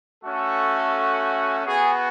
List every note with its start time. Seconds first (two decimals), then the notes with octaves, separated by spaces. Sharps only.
0.24 A3 C#4 F#4 A4
1.65 B3 F#4 G#4